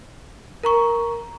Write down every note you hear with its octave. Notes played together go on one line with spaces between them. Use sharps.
A#4 A#5 C#6